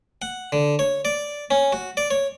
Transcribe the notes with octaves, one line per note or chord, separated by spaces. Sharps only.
F#5
D3
C#5
D5
C#4
F#4
D5
C#5